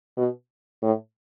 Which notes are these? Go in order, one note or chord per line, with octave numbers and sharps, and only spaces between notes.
B2
A2